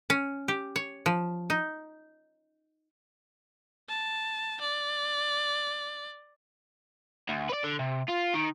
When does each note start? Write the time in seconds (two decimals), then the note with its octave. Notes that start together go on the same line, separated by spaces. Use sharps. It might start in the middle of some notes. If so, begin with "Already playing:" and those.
0.10 C#4
0.48 G4
0.76 C#5
1.06 F3
1.50 D#4
3.89 A5
4.61 D5
7.29 D2
7.49 B4 D5
7.64 D3
7.79 C3
8.09 F4
8.34 D#3